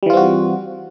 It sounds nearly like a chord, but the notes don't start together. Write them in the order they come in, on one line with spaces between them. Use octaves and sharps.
G3 E3 F4 C4 F#4